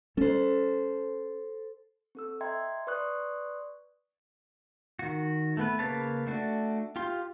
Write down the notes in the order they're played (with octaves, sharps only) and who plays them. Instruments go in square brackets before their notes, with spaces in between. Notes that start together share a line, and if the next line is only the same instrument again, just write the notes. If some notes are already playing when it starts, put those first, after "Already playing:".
[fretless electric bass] G3 C#4 [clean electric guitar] A4 C5
[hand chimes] C4 A4 E6
D#5 E5 G5 A#5 C6 G#6
B4 D5 C6 C#6 D#6 F#6
[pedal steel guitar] D#3 F#4
A3 B3 B4
C#3 A#3 B4 C#5 A5
A3 D4 F#4
F4 G4 C6